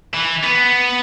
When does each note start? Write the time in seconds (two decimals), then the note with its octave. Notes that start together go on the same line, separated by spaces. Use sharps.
0.15 E3
0.44 B3